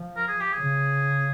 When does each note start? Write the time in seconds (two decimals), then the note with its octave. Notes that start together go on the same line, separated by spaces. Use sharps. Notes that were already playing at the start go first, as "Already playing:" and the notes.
Already playing: F3
0.16 A#4
0.28 G#4
0.40 G4
0.52 G#4
0.59 C#3